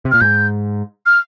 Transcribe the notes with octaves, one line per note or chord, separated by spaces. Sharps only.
C3
A#2 F6
G#2 G6
F6